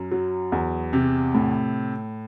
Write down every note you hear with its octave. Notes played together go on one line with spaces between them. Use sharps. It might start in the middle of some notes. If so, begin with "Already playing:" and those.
Already playing: F#2
F#3
E2
C3
A2